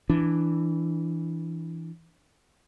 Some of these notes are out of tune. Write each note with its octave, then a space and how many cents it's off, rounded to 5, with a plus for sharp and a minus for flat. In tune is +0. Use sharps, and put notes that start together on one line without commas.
E3 +0 D4 +0